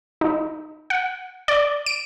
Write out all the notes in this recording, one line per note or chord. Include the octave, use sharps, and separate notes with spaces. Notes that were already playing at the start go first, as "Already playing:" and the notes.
D#4
F#5
D5
D7